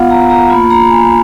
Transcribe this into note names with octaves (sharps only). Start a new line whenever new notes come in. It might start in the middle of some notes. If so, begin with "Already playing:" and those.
Already playing: B3 F4 F5 F#5
A#5
A#5
A#3 F4 B5
A#5
G#5